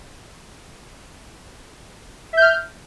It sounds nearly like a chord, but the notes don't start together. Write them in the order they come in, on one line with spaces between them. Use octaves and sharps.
E5 G6 F6